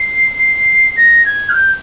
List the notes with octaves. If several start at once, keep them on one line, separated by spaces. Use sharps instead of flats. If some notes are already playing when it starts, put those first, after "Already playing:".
Already playing: C7
C7
A#6
G#6
F6
G6